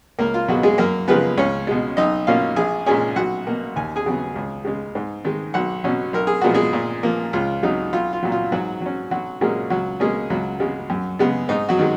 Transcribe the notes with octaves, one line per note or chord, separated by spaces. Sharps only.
C#2 A#3 A#4
F4
B2 F#3 G#3 B3 F#4
G#3 G#4
F#2 A#3 A#4
C#3 F3 G#3 B3 B4
C#2 C#4 C#5
B2 G#3
B1 D#4 D#5
B2 A#3 C#4 F4 F5
A#1 G#4 G#5
A#2 G#3 C#4 G#4 G#5
B1 F#4 F#5
B2 A#3
D#2 G#5
G#4 G#5
C#3 F#3 B3
C#2
C#3 G#3
G#2
D#3 G#3
B1 F#4 F#5
B2 F#3 C#4
B1 A#4
G#4
A#2 F3 G#3 B3 F#4
G#3 G#4
A#2
F3 A#3
C#2 F4
C#3 F#3 D#4
B1 F4
F4
A#2 F#3
F4
G#2 F#3 F#4
F#3 C#4
B1 F#3 F#4
A#2 F#3 G#3 A#3 C#4 G#4
C#2 F#3 F#4
B2 G#3 A#3 C#4 G#4
C#2 F#3 F#4
C#3 G#3
F#2
C#3 G#3 B3
G#2 D#4
F#3 F#4
D#3 G#3